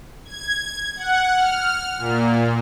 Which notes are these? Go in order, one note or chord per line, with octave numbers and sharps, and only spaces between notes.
G#6
F#5
F6
A#2